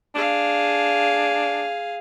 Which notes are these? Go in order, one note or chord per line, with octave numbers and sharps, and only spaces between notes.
D4 G#4 F5